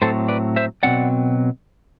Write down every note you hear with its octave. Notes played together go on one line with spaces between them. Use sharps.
A2 F#3 C4 A4 C5
B4 D5
C5 E5
B2 F#3 C4 D5 F#5